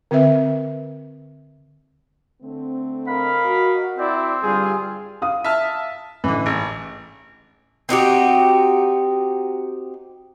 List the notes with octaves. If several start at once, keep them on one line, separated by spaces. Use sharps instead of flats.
D3 C4 B4 E5
D3 A3 C4
A#4 D#5 F5 B5
F#4
C4 E4 D5
G2 D3 G3 F4 G#4
F5 D#6
E5 A5 F6
A1 D3 E3
G#1
C4 D#4 F#4 G4